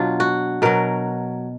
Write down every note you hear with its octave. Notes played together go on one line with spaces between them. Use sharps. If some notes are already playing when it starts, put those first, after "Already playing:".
Already playing: B2 F#3 D4 F4
F#4
B2 F#3 A#4